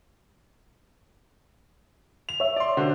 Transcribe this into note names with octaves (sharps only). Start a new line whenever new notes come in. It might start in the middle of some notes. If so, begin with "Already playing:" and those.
F7
C#5 E5
D5 C6
D3 F#4 C5